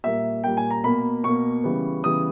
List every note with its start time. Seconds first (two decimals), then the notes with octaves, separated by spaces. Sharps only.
0.04 A#2 G3 A#3 E5
0.44 A#2 G3 A#3 G5
0.57 G#5
0.71 A#5
0.84 B2 A#3 B5
1.24 B2 A#3 C#6
1.64 C#3 E3 G3 B3
2.04 C#3 E3 G3 B3 D#6